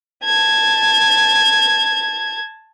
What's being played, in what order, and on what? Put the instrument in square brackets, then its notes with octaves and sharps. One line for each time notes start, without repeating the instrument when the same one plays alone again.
[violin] A5 G#6